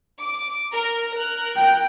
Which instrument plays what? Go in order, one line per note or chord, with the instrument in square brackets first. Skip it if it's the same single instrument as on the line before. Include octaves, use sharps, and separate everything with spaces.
[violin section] D6
A#4
A#4 F#6
[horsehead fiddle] G5